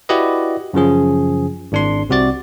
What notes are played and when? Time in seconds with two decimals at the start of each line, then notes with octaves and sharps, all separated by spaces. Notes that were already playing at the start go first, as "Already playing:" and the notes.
0.09 E4 F#4 G4 B4 D5 D#5
0.74 F#2 C#3 F3 G#4
1.72 G#1 D4 C6
2.09 C2 C3 F#4 D5 A6